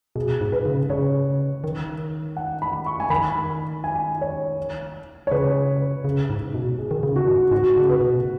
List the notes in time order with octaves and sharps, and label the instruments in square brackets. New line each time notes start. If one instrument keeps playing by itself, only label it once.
[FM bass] B2 [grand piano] G#4
[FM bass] G#2
[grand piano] B4
[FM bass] C#3
[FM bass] C#3 [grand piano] C#5
[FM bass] D#3
[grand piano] F#5
B5
C#6
G#5
[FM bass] D#3 [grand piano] B5
[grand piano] G#5
C#5
C#5
[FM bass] C#3 [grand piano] B4
[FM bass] C#3
G#2
B2
[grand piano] G#4
[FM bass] D#3
C#3
[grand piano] F#4
[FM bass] G#2
[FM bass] G#2 [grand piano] F#4
[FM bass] C#3
[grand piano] B4
[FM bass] B2